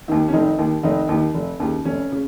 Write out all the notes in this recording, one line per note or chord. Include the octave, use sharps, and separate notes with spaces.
D#2 D#3
C#4
F1 D#3 D#4
D#2 D#3
F1 D#3 D#4
D#2 D#3
F1
D#2 C#3
F1 C#4
C#3